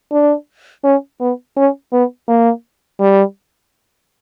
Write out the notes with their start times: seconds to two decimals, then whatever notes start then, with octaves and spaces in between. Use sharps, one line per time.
0.12 D4
0.84 C#4
1.20 B3
1.57 C#4
1.93 B3
2.28 A#3
3.00 G3